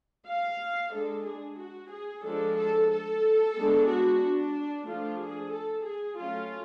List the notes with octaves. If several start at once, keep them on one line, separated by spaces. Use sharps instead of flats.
F5
G#3 D4 A4
G#4
F#4
G#4
F3 G#3 D4 A4
A4
A4
G#3 B3 D4
F#4
D4
F3 A3 D4 F4
G#4
A4
G#4
F#3 A3 C#4 F4